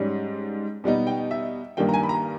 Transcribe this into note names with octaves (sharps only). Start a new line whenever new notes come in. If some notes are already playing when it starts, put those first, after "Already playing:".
Already playing: G#2 G3 C#4
B2 G3 B3 D#4
G5
E5
G2 D#3 G3 A#3 G5
A#5
G#5
B5
A#5